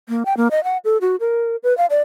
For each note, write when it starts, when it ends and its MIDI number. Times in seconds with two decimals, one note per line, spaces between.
0.09 0.23 58
0.26 0.36 79
0.37 0.48 58
0.51 0.63 75
0.64 0.77 78
0.85 0.98 69
1.01 1.16 66
1.20 1.56 70
1.63 1.76 71
1.78 1.86 77
1.90 2.02 74